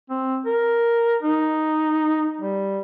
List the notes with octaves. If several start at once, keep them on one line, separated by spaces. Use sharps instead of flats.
C4
A#4
D#4
G3